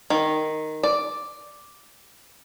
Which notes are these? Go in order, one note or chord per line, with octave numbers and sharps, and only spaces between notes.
D#3
D5